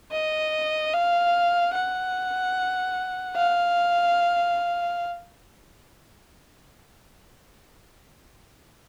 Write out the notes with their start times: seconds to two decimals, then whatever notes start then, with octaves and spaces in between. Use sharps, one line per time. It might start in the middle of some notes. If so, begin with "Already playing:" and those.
0.12 D#5
0.93 F5
1.74 F#5
3.36 F5